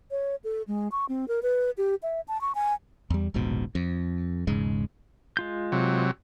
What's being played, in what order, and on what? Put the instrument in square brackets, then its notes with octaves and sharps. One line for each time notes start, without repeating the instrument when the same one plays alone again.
[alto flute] C#5
A4
G#3
C#6
C4
A#4
B4
G4
E5
A5
C#6
G#5
[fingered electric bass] E2 G3
D#1 A#1 G#2 B2
F2
E1 G#2 C#3 G#3
[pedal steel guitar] G#3 F4 G6
[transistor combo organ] C3 F#3